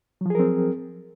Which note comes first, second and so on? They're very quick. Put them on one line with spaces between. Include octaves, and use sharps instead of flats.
F#3 F3 G#4 A#4 C4